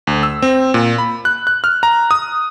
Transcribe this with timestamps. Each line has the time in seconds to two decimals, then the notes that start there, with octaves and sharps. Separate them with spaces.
0.07 D2
0.23 E6
0.42 C4
0.74 A#2
0.98 B5
1.25 F#6
1.47 F#6
1.64 F6
1.83 A#5
2.11 D#6